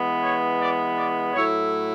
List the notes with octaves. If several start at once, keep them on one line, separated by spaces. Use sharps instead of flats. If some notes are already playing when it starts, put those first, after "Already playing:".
Already playing: E3 G#3 B3
C#5
D5
D5
A2 F#3 A3 E4 C#5